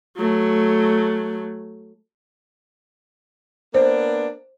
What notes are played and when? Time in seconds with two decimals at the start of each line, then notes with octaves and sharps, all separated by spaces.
0.17 F#3 A3
3.74 A#3 B3 D4 C5